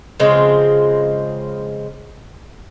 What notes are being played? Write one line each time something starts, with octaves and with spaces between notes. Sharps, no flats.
C#3 F3 G#3 C4